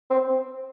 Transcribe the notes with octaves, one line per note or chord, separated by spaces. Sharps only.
C4